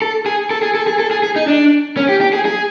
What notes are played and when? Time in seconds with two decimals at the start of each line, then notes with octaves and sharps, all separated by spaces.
0.02 A4
0.26 G#4
0.51 A4
0.63 G#4
0.75 A4
0.87 G#4
0.99 A4
1.11 G#4
1.23 G#4
1.36 D#4
1.47 D4
1.97 C#4
2.09 G4
2.21 G4
2.33 G#4
2.46 G#4